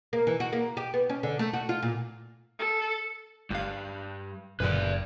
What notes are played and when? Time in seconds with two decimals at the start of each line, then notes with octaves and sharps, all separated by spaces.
0.13 A#3
0.27 E3
0.40 F#4
0.53 A#3
0.77 G4
0.94 B3
1.09 C#4
1.23 D3
1.39 A3
1.53 F#4
1.69 F4
1.82 A#2
2.59 A4
3.51 G1 G2 F5
4.60 F#1 F#2 A#2 D3 B4 D5